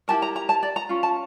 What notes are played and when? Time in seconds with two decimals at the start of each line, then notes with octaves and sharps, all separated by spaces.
0.08 E4 G4 A#4 A5
0.22 A#5
0.36 A#5
0.49 A5
0.63 D5
0.76 A#5
0.89 C#4 F4
1.03 A5